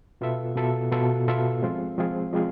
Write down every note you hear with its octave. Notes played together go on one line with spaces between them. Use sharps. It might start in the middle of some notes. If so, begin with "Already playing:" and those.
B2 B3 F4 A4 E5
B2 B3 F4 A4 E5
B2 B3 F4 A4 E5
B2 B3 F4 A4 E5
F3 G#3 C4 F4 G#4
F3 G#3 C4 F4 G#4
F3 G#3 C4 F4 G#4